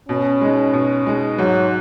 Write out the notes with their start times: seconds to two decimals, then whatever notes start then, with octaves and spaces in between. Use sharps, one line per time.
0.08 B2 C#4
0.41 G#3 D#4
0.73 B2
1.06 G#3 D#4
1.38 G#2 F#3